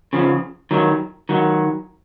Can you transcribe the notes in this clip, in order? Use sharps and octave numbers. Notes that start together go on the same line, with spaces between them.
C#3 F3
D#3 F#3
D#3 F#3